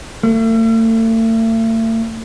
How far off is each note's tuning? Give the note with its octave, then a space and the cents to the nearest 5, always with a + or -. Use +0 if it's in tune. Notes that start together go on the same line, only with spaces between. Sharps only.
A3 +40